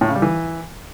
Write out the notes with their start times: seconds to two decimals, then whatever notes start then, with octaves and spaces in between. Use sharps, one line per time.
0.01 A2
0.08 C#3
0.15 G3
0.22 E3